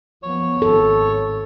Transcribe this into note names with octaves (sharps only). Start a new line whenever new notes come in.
F3 B3 C#5
G#1 A4